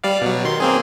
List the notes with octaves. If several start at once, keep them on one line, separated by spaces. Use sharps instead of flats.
G3 D5 F5
B2 F#3
D#3 C6
A#3 C4 G#4